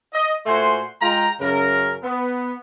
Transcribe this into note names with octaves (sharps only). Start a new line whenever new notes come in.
D#5
A#2 A3 F#4 C5 G#5 C6
G#3 F4 G5 A#5
F#2 C#3 C#4 A#4
B3